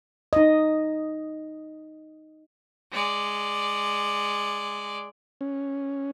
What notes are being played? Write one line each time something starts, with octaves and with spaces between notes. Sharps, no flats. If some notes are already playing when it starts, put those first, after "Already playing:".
D#4 D#5
G#3 D5
C#4